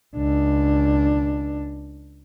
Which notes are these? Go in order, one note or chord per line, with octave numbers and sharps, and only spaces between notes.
C#2 D4